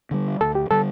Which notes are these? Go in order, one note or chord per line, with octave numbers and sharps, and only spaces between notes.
D3 G3
D2 A4
G4
D3 G3 A4